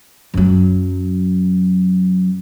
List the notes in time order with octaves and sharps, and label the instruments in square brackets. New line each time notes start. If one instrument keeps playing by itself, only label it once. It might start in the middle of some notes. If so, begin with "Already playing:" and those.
[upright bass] F#2 F#3